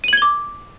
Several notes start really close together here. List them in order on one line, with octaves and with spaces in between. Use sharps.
D#7 F#7 G#6 G7 D6